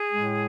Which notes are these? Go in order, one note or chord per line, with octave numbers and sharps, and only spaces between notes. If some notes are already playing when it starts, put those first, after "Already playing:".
Already playing: G#4
A2 G#3